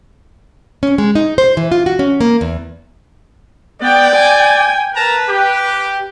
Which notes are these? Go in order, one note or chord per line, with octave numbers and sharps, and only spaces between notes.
C#4
G#3
D#4
C5
E3
F4
F#4
C#4
A#3
E2
B3 D5 G5
G5 G#5
A#4 B4 A5 A#5
G4